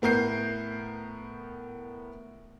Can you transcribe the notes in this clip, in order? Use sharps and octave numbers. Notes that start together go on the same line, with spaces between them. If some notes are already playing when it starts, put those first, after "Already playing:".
A2 B3 A#4 G6 C7